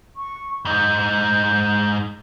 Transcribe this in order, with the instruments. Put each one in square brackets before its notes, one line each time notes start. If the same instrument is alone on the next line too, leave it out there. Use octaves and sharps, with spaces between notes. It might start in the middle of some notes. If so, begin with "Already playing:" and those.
[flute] C#6
[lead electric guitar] G#2 D#4 [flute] G6